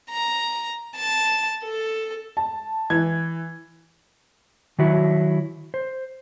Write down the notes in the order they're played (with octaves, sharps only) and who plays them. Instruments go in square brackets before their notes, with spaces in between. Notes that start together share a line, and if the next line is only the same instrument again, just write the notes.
[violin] A#5
A5
A4
[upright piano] A5
E3 G#6
[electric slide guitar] D#3 F#3 E4 F#4
C5